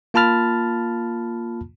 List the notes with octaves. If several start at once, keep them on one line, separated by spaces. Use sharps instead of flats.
A#3 F4 A5 B5 F6 A6